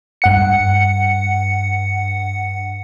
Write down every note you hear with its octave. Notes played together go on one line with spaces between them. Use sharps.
G2 F#5 C#7